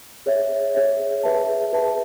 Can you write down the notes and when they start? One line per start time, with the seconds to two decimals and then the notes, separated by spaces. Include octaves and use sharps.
0.26 G#4 C#5 E5
0.75 G#4 C#5 E5
1.23 G#4 B4 E5 A5
1.73 G#4 B4 E5 A5